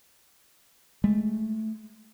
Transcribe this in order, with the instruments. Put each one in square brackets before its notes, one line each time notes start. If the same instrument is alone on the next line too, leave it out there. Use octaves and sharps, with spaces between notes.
[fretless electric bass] G#3 [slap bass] A3